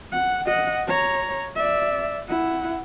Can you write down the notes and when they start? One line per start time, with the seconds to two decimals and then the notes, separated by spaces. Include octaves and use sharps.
0.12 F#5
0.46 D#5 F#5
0.87 C#5 A#5
1.55 D5 E5
2.28 E4 F#5